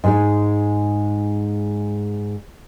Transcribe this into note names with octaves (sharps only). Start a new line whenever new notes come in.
G#2 G#3 D#4